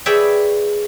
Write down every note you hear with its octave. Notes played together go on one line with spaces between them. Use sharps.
G#4 B4 C#5 D5 E5 G5